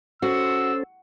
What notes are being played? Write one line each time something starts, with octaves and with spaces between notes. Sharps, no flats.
C#4 F#4 A4 C5 E6